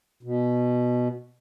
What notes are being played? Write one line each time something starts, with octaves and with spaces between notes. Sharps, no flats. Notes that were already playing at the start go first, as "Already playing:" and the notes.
B2